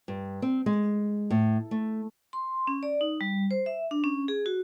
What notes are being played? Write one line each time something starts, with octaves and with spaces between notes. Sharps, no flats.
G2
C4
G#3
A2
A3
C6
C#4
D5
D#4
G3
C5
E5
D4
C#4
G#4
F#4